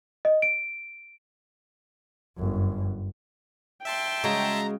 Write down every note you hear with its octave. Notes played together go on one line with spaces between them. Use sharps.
D#5
D7
G1 F#2
E5 G5 A5 C6
C#3 G#3 F#4 A#5